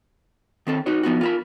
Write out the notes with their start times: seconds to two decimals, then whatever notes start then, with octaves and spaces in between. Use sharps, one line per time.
0.67 D#3 C4 A4
0.86 D#4 F#4 B4 C#5
1.03 F3 B3 D#4 F#4
1.21 F4 A#4 B5